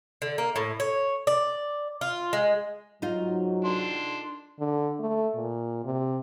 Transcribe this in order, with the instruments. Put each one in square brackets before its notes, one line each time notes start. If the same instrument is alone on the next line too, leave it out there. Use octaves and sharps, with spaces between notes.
[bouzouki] D3
A#3
A2
C#5
D5
F4
G#3
[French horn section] G#2 F#3 [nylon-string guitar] D#4 F4
[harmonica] D4 C6
[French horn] D3
A3
A#2
C3